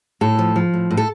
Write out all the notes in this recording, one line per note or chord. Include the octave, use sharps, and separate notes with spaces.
A2 A4
F3
F3
A2
A2
A4